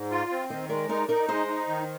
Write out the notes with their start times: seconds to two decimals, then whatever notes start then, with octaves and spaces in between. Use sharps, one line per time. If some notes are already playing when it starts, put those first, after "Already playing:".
Already playing: G#2 D5
0.11 F4
0.31 C4
0.50 D#3 C5 D#5
0.69 G#3 A#4 D5
0.89 D#4 A#4 D5
1.08 D#4 A#4 D5
1.28 G#3 C5 D#5
1.48 D#4
1.67 D#3